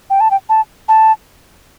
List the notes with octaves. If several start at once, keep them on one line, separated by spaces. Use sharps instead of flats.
G5
A5
G5
A5
A5